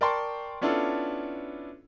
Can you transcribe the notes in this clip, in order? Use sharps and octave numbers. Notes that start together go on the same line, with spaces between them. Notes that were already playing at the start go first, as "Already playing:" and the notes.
A#4 D5 G5 A5 C6 C#6
B3 C#4 D4 E4 F4 A4